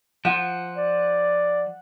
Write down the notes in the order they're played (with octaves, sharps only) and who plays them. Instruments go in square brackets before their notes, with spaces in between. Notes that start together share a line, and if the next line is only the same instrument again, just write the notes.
[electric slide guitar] F3 [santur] F#5
[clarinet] D5